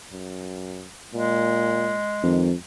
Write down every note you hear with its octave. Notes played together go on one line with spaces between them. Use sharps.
F#2
A#2 G#3
F2 D#3